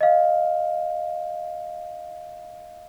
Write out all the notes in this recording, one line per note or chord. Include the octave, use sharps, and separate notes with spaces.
D#5 F5